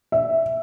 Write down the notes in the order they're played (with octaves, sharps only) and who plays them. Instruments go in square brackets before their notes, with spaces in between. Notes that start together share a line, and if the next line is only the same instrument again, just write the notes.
[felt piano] E5